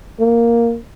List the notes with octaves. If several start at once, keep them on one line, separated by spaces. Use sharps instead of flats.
A#3